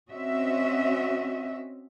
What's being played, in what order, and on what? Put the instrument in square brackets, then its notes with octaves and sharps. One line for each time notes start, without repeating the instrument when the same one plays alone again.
[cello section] C4 C#4 F#4 D#5 E5